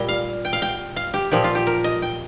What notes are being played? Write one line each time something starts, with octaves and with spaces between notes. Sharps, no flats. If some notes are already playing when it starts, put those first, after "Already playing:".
Already playing: A#2 G3 G5
F5
G5
F5
G5
F5
G4
A#2 F3 G4
F4
G4
A#4
D#5
G5